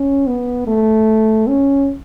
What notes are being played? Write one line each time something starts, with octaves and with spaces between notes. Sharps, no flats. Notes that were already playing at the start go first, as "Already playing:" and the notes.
Already playing: C#4
B3
A3
C#4